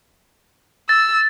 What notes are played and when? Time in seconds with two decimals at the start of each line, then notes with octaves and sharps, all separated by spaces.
0.89 E6 A6